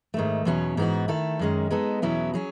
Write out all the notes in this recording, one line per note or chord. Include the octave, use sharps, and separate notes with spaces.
G#2 D#3 A3
E2 B2 F#3 C#4
G#2 E3 B3 D#4 F#4
D#3 A3 E4 A4
F#2 D#3 G#3 C#4
G#3 B3 D#4 A4
E2 B2 F#3 C#4 E4
F#3 C#4 G#4